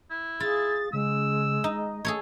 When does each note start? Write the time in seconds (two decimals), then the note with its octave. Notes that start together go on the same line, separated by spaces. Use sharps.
0.11 E4
0.40 F4 G#4 A6
0.93 C#3 G#3 E6
1.64 D#4 D#5
2.05 A3 G#4 A4 C#5